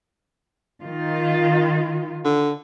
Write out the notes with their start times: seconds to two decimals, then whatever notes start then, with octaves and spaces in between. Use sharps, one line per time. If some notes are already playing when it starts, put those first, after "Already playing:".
0.82 D#3 F4
2.24 D3